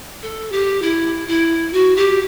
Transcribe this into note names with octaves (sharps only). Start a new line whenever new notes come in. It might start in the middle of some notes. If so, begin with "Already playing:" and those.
A4
G4
E4
E4
F#4
G4